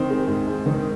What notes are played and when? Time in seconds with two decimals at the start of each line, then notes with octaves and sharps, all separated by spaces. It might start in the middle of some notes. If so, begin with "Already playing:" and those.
Already playing: D#3 C4 C5
0.10 G#3
0.28 G#2
0.47 G#2
0.66 D#3